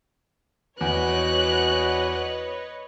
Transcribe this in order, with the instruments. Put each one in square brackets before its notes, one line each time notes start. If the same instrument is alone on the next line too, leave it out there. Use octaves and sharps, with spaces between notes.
[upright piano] E2 [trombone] F#4 [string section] B4 C#5 D#5 [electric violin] F#6